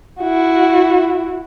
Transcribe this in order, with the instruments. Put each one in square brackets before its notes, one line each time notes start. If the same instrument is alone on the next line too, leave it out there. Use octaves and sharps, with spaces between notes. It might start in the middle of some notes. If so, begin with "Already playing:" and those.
[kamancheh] E4 F#4